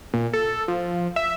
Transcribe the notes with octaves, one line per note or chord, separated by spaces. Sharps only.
A#2
A4
F3
E5